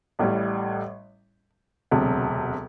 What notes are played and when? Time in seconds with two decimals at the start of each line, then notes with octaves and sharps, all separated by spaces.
0.19 A1 A2 G3
1.91 E1 D2 C3 F#3